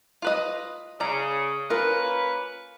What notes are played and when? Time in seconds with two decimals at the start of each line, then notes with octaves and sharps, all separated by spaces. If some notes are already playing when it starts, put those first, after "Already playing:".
0.22 F4 B4 D#5
1.00 C#3 D5 A#5
1.70 A#3 C#4 F4 A#4 B4